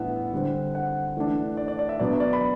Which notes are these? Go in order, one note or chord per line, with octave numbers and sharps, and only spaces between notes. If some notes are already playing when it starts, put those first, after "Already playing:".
Already playing: A2 E3 G3 B3 D4 E5 F#5
D3 G3 C4
F#5
E3 A3 D4
D5
D5
D5
E5
B2 F#3 B3 D4 D5
D5
B5